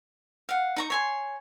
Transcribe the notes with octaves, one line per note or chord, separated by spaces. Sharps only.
F5 F#5
D#4 A#5 C#6
C#5 G#5 C6